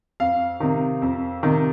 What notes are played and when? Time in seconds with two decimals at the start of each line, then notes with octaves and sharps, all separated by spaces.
0.20 F2 F5
0.60 C3 D#3
1.02 F2
1.43 C3 D#3